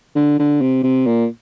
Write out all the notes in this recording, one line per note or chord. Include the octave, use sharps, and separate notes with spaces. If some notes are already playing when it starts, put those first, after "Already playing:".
D3
D3
C3
C3
A#2